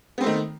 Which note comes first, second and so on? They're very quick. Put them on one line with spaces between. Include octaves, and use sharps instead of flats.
B3 C4 A3 D#3